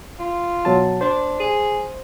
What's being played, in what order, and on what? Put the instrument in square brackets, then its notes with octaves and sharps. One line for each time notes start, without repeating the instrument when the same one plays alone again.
[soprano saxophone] F4
[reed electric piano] B2 F#3 A5
[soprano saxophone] D4 [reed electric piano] C5
[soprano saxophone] G#4